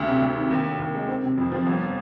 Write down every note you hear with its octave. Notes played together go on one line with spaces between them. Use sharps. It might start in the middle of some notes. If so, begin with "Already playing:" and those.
Already playing: D2
C3
D2
D#3
D#2
D3
D#2
G#3
C4
C3
F2
F3
G1